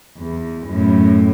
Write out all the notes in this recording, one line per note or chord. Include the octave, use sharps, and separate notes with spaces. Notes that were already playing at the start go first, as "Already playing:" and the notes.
E2
F#2 A2